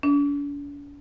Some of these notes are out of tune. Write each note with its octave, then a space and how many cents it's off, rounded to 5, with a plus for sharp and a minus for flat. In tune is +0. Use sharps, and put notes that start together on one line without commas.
D4 -45